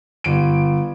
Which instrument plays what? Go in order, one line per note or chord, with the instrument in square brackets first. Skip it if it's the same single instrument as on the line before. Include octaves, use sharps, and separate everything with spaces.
[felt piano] G1 D7